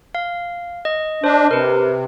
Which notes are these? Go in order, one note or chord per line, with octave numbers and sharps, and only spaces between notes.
F5
D#5
D4 C5 D#5
C3 A#4 B4